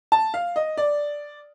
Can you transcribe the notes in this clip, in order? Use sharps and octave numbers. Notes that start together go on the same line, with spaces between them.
A5
F5
D#5
D5